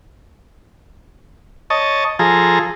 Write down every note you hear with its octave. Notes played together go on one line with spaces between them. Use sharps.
C#5 D#5 A5
F3 G#4 A4 A#5